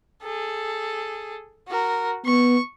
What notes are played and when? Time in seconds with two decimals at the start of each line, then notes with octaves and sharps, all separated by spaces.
0.23 G#4 A4
1.68 F#4 A#4
2.26 B3 C#6